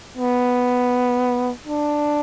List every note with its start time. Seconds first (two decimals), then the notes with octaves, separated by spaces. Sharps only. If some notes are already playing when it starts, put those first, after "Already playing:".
0.18 B3
1.67 D4